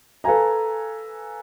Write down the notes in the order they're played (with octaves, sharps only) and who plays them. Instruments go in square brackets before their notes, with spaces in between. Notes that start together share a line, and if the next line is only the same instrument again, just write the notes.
[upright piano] A4 B4 F5 G#5 A#5